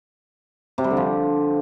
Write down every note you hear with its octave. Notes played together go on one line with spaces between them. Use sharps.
C3
G3
D3
F3